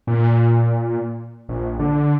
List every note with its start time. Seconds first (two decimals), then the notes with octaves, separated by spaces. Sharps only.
0.07 A#2
1.49 A#1
1.80 D3